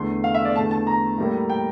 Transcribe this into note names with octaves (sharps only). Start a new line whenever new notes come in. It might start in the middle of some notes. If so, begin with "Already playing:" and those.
Already playing: E2 D3 A3 E4 C6
F5
E5
D5
E2 D3 A3 A5
A5
A#5
A2 G3 A#3 E4
G5